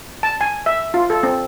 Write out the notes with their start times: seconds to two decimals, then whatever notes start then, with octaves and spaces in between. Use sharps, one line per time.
0.23 A5
0.41 G#5
0.66 E5
0.94 F4
1.10 A4
1.23 C4